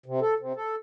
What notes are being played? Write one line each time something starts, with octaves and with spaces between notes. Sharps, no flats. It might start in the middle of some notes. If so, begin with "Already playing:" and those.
C3
A4
C3
A4